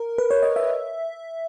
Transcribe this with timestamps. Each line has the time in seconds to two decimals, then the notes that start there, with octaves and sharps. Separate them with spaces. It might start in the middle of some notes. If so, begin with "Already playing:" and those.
Already playing: A#4
0.18 B4
0.31 C#5
0.43 D#5
0.56 E5